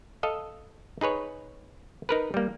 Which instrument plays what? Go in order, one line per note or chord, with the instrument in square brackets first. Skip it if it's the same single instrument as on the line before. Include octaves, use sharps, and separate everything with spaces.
[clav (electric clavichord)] A4 D#5 F5
D#4 G#4 B4 C#5
D#4 A#4 B4
G3 A#3